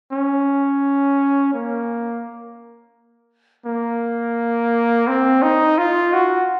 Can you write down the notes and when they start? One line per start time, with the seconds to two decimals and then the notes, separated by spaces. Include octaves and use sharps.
0.12 C#4
1.54 A#3
3.66 A#3
5.08 C4
5.43 D#4
5.78 F4
6.13 F#4